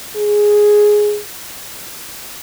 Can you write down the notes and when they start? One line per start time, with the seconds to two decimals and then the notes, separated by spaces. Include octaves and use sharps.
0.16 G#4